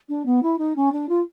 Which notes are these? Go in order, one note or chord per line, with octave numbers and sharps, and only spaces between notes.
D4
B3
E4
D#4
C#4
D4
F4